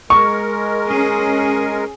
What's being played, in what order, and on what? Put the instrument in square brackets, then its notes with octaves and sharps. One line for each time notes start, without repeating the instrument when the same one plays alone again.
[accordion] G#3 A#4 [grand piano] C#6
[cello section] C#4 G#4